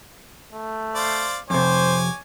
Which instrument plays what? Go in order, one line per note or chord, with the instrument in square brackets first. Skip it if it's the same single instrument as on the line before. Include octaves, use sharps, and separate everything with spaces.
[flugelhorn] A3
[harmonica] C5 D5 F5
[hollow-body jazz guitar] F2 C3 [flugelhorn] C5 [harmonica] C#5 G#5 D6